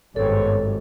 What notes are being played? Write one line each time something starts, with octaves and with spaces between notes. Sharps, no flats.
G#1 G2 B3 C4 A4 C#5